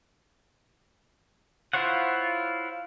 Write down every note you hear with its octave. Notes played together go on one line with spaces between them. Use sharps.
E4 F4 C5 C#5 F#5